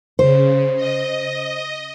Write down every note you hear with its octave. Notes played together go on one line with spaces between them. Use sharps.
C#3 C5
D#5